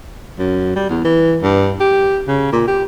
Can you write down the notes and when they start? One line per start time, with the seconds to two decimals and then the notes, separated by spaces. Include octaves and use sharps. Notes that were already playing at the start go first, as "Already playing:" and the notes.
0.39 F#2
0.76 G3
0.89 E2
1.04 E3
1.43 G2
1.80 G4
2.28 C#3
2.53 A#2
2.68 G4